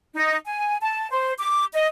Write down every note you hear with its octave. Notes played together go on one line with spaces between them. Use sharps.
D#4
G#5
A5
C5
D6
D#5